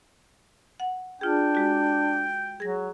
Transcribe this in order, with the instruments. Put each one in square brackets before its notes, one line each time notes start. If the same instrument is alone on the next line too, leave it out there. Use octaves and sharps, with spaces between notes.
[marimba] F#5
[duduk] D4 [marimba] F4 G#4 [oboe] G5
[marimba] G#3 F#4
[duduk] F#3 [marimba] G#4 A#6